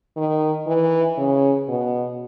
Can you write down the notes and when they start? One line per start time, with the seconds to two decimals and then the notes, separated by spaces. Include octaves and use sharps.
0.17 D#3
0.67 E3
1.18 C#3
1.68 B2